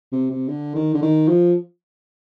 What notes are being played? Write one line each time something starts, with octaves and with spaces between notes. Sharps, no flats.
C3
C3
D3
D#3
D3
D#3
F3